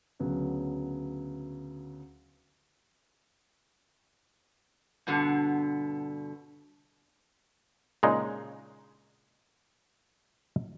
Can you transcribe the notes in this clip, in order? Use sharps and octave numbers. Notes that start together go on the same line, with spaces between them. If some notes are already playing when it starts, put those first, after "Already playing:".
D2 C#3 F#3 B3 C#4
G2 B2 D3
A#2 C#3 G#3 D4 D#4